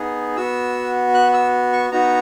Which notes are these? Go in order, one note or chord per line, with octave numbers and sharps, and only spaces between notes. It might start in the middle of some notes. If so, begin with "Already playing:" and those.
Already playing: B3 D#4 G#4
B3 F#4 E6
F#6
E6
C#6
B3 D#4 F#4 A#5